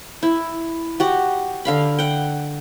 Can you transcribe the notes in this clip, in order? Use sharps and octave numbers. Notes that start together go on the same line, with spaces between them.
E4
F#4 G4 F#5
D3 F5 B5
F#5 G5